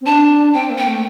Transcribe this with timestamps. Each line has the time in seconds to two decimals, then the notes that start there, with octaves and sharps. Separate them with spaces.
0.01 C4
0.06 D4 A5
0.54 C4 G5
0.70 A#3
0.78 G5
0.86 A3